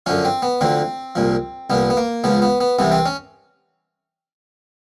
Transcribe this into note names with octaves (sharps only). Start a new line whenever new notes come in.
F#2 D3 F3 C#4
C4
B3
D2 D3 F3 C4
C2 A#2 F3
C2 A#2 F3 B3
B3
A#3
C#2 C#3 F3 B3
B3
B3
C2 C3 E3 B3
C4
C#4